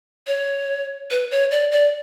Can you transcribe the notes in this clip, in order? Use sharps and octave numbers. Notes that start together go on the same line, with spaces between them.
C#5
B4
C#5
D5
D5